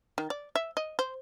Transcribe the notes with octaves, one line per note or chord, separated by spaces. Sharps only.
D#3
D5
E5
D#5
C5